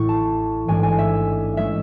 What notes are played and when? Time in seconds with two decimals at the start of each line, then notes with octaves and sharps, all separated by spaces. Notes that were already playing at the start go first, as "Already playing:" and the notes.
Already playing: A1 A2 C#6
0.09 A5
0.68 A1 G#2 G#3 D4 G#5
0.83 G#5
0.99 E5
1.57 G#3 C#4 E5